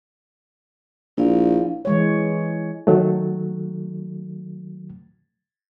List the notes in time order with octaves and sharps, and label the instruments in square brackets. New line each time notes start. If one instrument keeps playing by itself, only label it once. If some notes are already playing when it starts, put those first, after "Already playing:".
[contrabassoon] A#1 [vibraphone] E4 D5 F5
[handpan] E3 G#3 C#5
[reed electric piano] D#3 F#3 A3